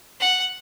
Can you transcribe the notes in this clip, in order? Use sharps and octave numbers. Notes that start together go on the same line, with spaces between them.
F#5